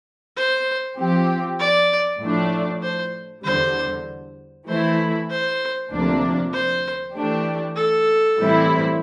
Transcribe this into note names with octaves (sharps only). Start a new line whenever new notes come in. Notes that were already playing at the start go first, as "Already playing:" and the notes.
C5
F3 C4 G4
D5
A2 F3 A3 D4
C5
E2 D3 G3 C5
E3 A3 E4 C5
C5
D2 C3 F3 A#3 D4
C5
E3 A3 D4 G4
A4
A2 E3 G3 C4 E4